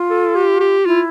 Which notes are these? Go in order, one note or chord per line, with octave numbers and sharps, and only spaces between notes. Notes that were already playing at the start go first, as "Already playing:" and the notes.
Already playing: F4
A4
G4
G4
E4 F4